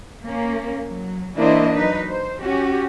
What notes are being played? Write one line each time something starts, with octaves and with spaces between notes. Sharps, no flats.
A#3 C#4
F#3
E3 A#3 D4 E4 C5 D#5
F#3 D#4 B4
C5
C#4 F#4 G4